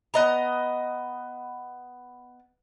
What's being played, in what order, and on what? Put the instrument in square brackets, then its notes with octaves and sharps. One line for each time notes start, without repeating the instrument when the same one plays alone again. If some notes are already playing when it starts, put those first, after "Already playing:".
[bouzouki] B3 D#5 A#5